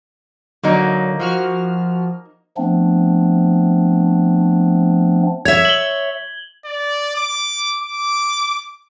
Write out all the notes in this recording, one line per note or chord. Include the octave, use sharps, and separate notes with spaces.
D3 F#3 A#3 D#4
F3 F#4 F6
F3 A3 B3 C4 D4
C#5 E5 G#6
F#7 G7
D5
D6
D6